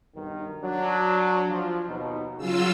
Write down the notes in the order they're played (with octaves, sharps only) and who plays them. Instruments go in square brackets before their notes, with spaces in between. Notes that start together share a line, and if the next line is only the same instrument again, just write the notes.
[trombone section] B1 G2 D#3
F#3 D4
F3
D#2 B2 D#4
[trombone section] C#3 [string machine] F#3 F4 E6